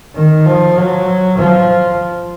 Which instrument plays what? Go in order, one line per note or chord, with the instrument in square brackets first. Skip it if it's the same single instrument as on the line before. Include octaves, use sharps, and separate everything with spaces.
[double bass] D#3
F3
F#3
F3